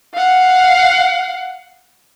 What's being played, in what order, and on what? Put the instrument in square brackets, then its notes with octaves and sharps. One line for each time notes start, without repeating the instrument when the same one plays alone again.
[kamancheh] F5 F#5